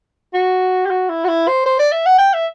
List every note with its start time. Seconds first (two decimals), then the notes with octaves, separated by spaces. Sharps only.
0.34 F#4
0.86 G4
0.90 F#4
1.09 E4
1.24 F#4
1.28 E4
1.47 C5
1.66 C5
1.79 D5
1.92 E5
2.06 F#5
2.18 G5
2.33 E5